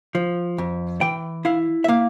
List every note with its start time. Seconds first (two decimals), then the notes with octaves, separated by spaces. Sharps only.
0.15 F3
0.58 F2
1.01 E3 G5
1.45 E4 F5
1.84 E5
1.88 A#3 F5